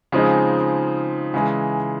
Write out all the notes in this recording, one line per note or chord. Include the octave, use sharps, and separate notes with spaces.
C#3 F3 G#3 C4 D#4
C#3 E3 G#3